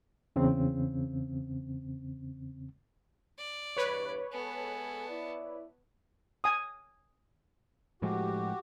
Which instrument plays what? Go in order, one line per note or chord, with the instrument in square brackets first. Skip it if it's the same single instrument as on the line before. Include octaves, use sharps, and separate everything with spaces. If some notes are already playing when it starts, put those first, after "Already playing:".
[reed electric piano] E2 C#3 C4
[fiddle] D5
[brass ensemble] E2 G2 [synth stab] B4 C#5
[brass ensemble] G#3 A4 G#5 [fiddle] B3 A5
[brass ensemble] E4 D5
[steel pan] G#5 D#6
[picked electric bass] A2 F3 G#3 [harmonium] F#4 G4